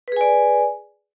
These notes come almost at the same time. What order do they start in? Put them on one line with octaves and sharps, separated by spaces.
B4 G#4 G#5 D5